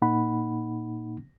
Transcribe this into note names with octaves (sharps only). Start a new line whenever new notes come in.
A#2 A#3 D#4 F#5 B5